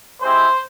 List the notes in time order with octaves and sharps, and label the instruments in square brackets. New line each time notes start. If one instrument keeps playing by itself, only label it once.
[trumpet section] G#3 C4 E4 G4 C5